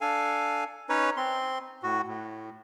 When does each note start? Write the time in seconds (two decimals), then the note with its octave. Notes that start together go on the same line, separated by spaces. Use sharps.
0.01 D4 A4 F5 G#5
0.89 C#4 D#4 B4 C#5
1.17 C4 C6
1.83 A2 F#4
2.07 A2